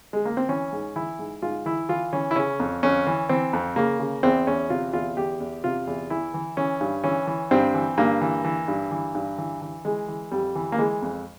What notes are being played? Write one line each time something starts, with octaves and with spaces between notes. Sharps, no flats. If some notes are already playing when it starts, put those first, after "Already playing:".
G#3
A#3
C4
E3 C#4
G#2
E3 E4
G#2
G#2 F4
E3 E4
E3 F4
E3 C#4
E4
C#3 C#4
F2
F2 C#4
E3
E3 C4
F2
C#3 A#3
C#3
E2 C4
E2 C#4
C3 F4
E2 F4
E2 G4
E2
C3 F4
E2
E3 E4
E3
E3 C#4
G2
E3 C#4
E3
G2 C4
E3
G2 A#3
E3
E3
G2
E3
G2
E3
E3
E3 G#3
E3
F2 G3
E3
A#3
E3 G#3
F2